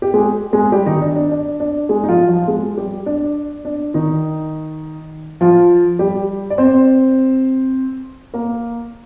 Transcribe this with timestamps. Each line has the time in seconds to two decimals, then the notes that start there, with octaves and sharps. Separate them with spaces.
0.02 G4
0.14 G#3 G#4
0.53 G#3 G#4
0.72 G3 G4
0.86 D#3 D#4
1.02 D4
1.16 D4
1.31 D4
1.60 D4
1.89 G#3 G#4
2.04 D#4
2.09 F3 F4
2.29 F3 F4
2.48 G#3 G#4
2.77 G3 G4
3.06 D4
3.65 D4
3.94 D#3 D#4
5.41 F3 F4
5.99 G3 G4
6.50 D5
6.58 C4 C5
8.34 A#3 A#4